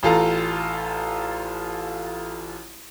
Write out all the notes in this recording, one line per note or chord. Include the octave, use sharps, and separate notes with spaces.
A1 F4 A4 A#5